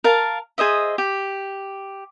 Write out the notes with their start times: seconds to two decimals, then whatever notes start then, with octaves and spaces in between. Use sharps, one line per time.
0.04 A#4 F5 A5
0.58 G#4 C5 D#5 E5
0.98 G4